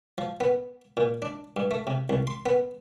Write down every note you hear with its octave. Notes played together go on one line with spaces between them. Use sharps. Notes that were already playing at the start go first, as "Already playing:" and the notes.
F3
B3
A#2
D4
G2
A3
C3
C2
C6
B3